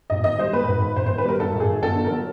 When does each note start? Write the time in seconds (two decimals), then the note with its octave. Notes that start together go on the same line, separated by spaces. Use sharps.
0.10 G#1 D#5
0.24 D#3 D#5
0.38 G3 C5
0.53 G#2 B4
0.68 G#1
0.82 D#3
0.96 G#1 C5
1.06 D#3 C5
1.18 B4
1.25 G3 A#4
1.39 G2 A4
1.54 G#1
1.60 G#4
1.68 D#3
1.82 G1 A4
1.96 D3
2.04 A#4
2.10 F#3